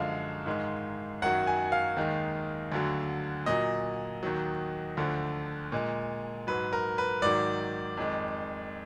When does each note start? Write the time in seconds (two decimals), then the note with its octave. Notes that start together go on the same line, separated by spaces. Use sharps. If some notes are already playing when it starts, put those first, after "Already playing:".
Already playing: F#2 D3 F3 G#3 F5
0.46 G#2 D#3 G#3
1.22 F#2 D#3 F#3 F#5
1.47 G#5
1.72 F5
1.97 D#2 D#3 G#3
2.72 D2 D3 F#3
3.46 A#2 F#3 D#5
4.23 D#2 D#3 F#3
4.97 D2 D3 F3
5.72 A#2 G#3
6.47 G#2 F#3 B4
6.73 A#4
6.98 B4
7.22 G#2 D#3 F#3 D5
7.97 F2 D#3 G#3